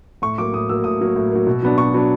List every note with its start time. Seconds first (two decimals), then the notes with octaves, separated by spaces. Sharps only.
0.22 A2 C#6
0.38 F#3 A#3 D6
0.53 A2 D#6
0.69 F#3 A#3 E6
0.84 A2 D#6
1.01 F#3 A#3
1.16 A2
1.32 F#3 A#3
1.47 B2
1.63 F#3 B3 D4
1.78 B2 C#6
1.94 F#3 B3 D4